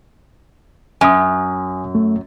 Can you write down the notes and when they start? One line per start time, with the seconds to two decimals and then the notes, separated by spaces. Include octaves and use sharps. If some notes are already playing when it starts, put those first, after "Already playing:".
1.01 F#2 G#5 D#6
1.95 A3